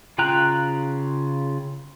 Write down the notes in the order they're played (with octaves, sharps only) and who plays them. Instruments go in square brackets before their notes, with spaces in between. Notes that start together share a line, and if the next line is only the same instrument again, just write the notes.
[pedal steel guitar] C#3 F4 G5 A#5 F#6